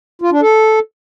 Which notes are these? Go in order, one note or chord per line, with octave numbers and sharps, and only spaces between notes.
F4
D4
A4